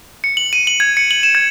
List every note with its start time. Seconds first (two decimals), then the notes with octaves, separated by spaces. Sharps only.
0.24 C#7
0.37 F#7
0.53 D#7
0.67 F#7
0.80 G#6
0.97 C#7
1.11 F#7
1.23 E7
1.35 G#6